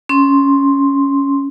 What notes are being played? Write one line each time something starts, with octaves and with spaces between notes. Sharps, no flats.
C#4 C6